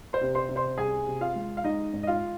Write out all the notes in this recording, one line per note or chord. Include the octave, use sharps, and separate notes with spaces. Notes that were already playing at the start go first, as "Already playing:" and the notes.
C5 C6
C3
C5 C6
C3
C5 C6
C2 G#4 G#5
C3
F4 F5
G#3
F5
G#3 D#4 D#5
G#2
D#5
F4 F5